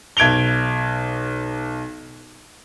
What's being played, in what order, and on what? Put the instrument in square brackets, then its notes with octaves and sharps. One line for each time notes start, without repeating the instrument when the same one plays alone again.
[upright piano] B1 G#6 D7 F7 G7